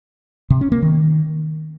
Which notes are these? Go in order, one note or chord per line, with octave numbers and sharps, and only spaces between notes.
C3
C#4
A#3
D#3